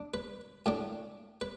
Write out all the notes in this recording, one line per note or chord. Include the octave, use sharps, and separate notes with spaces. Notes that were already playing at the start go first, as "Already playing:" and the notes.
Already playing: D4
B4
A2 A3 D4
B4